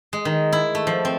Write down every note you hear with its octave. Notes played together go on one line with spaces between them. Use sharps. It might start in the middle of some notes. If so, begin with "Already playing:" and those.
G#3
D#3
E4
A3
F3
C4